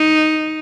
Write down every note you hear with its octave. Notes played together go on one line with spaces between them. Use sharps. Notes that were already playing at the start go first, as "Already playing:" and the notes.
Already playing: D#4